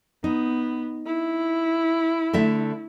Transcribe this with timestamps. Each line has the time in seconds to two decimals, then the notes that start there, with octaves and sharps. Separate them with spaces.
0.24 B3 D#4
1.06 E4
2.33 D3 A3 E5